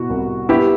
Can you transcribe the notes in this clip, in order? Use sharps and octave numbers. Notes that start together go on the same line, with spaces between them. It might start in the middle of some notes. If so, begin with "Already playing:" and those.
Already playing: B2 E4 F#4
C2
B3 E4 G4